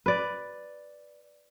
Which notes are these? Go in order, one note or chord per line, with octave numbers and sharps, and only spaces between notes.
B4 D5